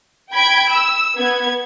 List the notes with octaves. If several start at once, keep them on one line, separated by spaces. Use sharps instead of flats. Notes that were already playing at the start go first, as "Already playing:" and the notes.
G5 B5 G#6 D7
E6
B3 G#6